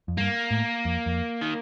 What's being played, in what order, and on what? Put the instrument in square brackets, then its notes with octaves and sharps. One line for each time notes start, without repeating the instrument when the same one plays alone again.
[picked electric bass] F2
[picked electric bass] G2 [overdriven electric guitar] A#3
[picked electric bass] A2
F2
F2
[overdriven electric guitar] D#3